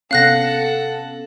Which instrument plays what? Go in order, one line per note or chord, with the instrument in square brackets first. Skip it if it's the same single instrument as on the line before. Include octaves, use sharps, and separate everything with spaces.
[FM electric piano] C3 B3 C#4 [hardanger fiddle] A4 F#5 [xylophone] F5 F#6 A#6